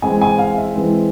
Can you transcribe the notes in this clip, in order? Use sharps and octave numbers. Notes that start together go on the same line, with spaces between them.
E3 G#3 C4 G#5
G#5
F5
E5
E3 G#3 C4